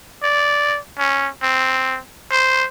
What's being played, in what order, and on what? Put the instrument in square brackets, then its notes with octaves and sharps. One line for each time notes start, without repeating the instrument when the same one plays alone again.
[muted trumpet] D5
C#4
C4
C5